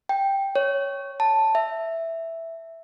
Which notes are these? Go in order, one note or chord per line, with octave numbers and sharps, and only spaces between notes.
G5
C#5
A5
E5